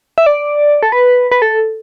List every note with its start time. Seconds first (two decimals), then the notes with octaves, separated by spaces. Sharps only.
0.18 E5
0.26 D5
0.83 A4
0.92 B4
1.32 B4
1.42 A4